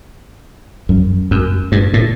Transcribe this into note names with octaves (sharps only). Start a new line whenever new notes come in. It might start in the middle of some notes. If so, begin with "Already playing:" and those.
F#2
F#2
G2
A2